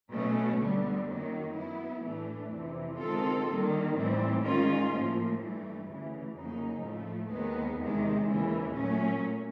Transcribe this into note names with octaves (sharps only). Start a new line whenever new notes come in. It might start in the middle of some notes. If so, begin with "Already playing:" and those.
B2 F#3 A3 C#4
D2 D3 G3 B3
F#2 D#3 F#3 A#3
F#3 B3 E4
A2 E3 A3 D4
F2 C3 E3
D#3 G#3 C4 F4 A4
D#3 G3 A#3
A2 E3 G3 C4
G#2 D#3 G#3 C#4 F4
A2 F3 A#3
G2 E3 A3
D2 C#3 E3
F2 C#3 F#3 A#3 D#4
A2 F3 A3
D#2 D#3 G#3 B3
E2 C3 D#3 G#3
D#2 C#3 E3
A#2 F#3 A3 C#4